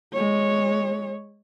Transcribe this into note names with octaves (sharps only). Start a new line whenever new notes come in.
G#3 C#5